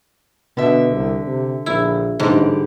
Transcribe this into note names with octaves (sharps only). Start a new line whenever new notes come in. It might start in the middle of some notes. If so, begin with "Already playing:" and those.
B2 D3 E5
C2
C3
A#1 E4
A1 G#2 D3 G3